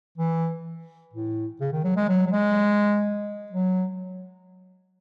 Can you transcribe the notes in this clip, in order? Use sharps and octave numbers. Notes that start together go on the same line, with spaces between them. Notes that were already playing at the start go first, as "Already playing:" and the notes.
E3
A2
C#3
D#3
F#3
G#3
F#3
F#3
G#3
F#3